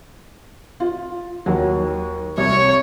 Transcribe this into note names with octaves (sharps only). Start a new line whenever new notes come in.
F4
D#2 F#3
C2 C#5